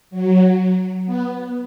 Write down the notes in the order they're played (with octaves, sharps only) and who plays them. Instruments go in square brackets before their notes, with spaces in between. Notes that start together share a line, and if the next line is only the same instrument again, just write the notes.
[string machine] F#3
B3